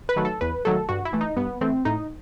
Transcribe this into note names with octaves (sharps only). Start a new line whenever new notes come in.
B4
D#3 F#3 A3
A4
E2 B4
D#3 F#3 A3 A4
G2 F#4
E4
E3 A3
D#4
G2 B3
E3 A3 C4
A2 D#4